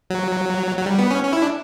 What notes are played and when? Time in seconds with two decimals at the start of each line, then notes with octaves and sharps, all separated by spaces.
0.10 F#3
0.78 F#3
0.86 G3
0.99 B3
1.10 C#4
1.24 C#4
1.33 E4
1.42 D4